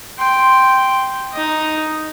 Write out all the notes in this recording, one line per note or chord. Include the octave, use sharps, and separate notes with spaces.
G5 C6
D#4 D#5